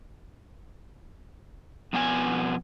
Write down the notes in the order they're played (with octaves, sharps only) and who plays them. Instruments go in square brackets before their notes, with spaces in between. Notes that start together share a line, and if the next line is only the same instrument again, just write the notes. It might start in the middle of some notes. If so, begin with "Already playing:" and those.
[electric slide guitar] F2 B2 B3 E4 G#5